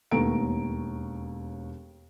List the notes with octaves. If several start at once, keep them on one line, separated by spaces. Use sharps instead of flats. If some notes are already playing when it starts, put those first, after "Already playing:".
E1 D#2 A3 B3 A#5 D7